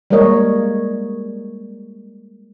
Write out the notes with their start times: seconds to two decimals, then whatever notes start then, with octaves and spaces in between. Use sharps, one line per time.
0.10 G3 G#3 A#3 A#4 C#5 D#5